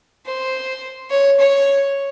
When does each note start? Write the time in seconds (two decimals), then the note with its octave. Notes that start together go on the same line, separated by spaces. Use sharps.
0.26 C5
1.10 C#5
1.39 C#5